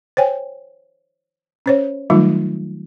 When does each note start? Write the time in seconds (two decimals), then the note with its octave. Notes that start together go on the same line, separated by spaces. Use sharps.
0.17 C5 C#5 G5 G#5
1.66 C#4 C5 C#5
2.10 D#3 F#3 G3 A3 D#4 F4